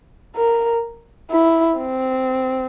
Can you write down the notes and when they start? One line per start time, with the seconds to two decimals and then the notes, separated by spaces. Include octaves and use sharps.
0.36 A#4
1.31 E4
1.78 C4